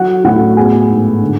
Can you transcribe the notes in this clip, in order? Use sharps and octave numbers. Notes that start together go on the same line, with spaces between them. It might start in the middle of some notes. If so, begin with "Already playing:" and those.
Already playing: F#3 F#4 F#5
A2 F#4 F#5
B3 G#4 G#5
G#2
D3